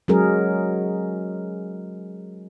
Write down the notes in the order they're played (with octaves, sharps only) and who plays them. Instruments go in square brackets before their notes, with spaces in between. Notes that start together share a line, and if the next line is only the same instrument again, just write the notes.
[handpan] F#3 G#3 C#4 G#4 A#4